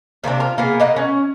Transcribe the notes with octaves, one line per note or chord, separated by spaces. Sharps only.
C3 A#3 C4 D4
F4
A#3 B3 G#4
A#3 D#5 F#5
C#4